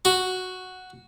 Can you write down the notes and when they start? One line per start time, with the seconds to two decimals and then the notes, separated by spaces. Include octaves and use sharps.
0.05 F#4